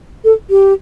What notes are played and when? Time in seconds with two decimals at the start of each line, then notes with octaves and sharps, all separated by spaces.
0.24 A4
0.50 G4